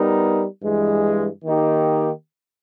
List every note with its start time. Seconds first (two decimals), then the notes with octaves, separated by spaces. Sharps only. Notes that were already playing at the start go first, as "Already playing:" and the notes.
Already playing: G3 B3 D#4 A#4
0.61 G2 E3 G#3
1.44 D#3 A#3 D#4 G4